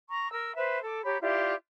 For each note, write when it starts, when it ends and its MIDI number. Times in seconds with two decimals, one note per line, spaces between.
0.09 0.31 82
0.09 0.31 85
0.32 0.55 70
0.32 0.55 88
0.56 0.80 71
0.56 0.80 72
0.56 0.80 76
0.83 1.01 69
0.83 1.01 86
1.04 1.17 67
1.04 1.17 73
1.04 1.17 82
1.04 1.17 83
1.21 1.54 64
1.21 1.54 65
1.21 1.54 67
1.21 1.54 74